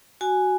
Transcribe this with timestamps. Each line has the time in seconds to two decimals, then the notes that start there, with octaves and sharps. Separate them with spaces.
0.21 F#4 G#5